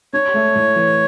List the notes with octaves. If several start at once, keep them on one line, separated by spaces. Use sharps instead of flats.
D4 C#5
A3
A2
E3